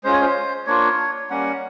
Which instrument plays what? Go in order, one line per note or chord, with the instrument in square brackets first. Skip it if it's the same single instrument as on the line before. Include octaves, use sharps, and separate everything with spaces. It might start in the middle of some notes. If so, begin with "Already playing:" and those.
[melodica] G#3 C#4 F4 C5
C#5
C5
A#3 D4 F4 C#5
G3 A#3 C#4 F#5